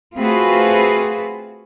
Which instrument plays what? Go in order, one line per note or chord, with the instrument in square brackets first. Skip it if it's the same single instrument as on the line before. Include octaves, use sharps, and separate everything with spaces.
[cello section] A3 C4 F4 F#4 G#4 B4